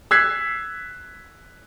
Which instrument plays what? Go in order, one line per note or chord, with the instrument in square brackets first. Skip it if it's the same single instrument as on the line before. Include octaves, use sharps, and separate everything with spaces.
[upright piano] E6 F#6 G#6 B6 C7